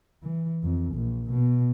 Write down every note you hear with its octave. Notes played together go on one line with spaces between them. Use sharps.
E3
F2
A#1
B2